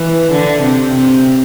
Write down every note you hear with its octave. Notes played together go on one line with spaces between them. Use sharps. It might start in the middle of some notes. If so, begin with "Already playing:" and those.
Already playing: E3
D3
C3
C3